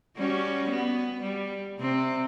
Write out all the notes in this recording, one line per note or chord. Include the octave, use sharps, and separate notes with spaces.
G3 C#4 F#4
B3
G3
C3 C4